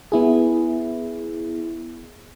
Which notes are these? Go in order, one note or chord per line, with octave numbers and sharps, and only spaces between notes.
B3 E4 G#4